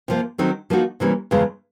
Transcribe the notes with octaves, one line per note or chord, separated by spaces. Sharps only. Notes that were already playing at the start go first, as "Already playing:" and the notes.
C3 F3 A#3
D#3 F#3 A3 C4 D#4
F3 A#3 D#4 F#4
C3 E3 G3 A#3 C#4
E2 C#3 F3 G#3